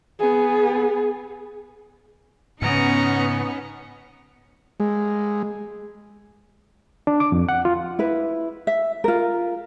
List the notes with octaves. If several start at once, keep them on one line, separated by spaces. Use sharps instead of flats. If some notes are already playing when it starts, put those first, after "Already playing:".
B3 G#4
G#2 C#3 B3 C#4 D#4 A#5 C#7
G#3
D4
D6
F2
F#5
F4
E4 B4
E5
F4 A#4